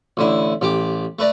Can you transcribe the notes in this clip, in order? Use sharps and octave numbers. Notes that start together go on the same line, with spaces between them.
A1 D3 E4
A1 G4 D6
A3 B4 D5 A#5